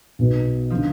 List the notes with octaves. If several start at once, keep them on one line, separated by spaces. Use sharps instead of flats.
B1 B2 B3
F3
D3